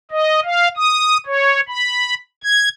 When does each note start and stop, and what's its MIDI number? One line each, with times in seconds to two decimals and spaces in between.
0.11 0.40 75
0.45 0.68 77
0.77 1.17 87
1.27 1.61 73
1.68 2.14 83
2.43 2.69 92